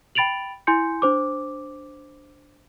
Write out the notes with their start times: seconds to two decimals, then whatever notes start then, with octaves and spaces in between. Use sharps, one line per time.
0.15 G5 B5 A6 D7 F7 F#7
0.67 E4 G#5 C6 G6 C#7
1.02 D4 C5 D6